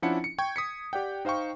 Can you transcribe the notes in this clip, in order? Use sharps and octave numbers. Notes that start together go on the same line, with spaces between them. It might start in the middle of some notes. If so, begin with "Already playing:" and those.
F3 C#4 D4 E4 F#5 C#7
C#7
G5 C#6 G#6
D#6 B6 C#7
G4 D5 F#5 G5
D#4 C5 F5 G5 C#6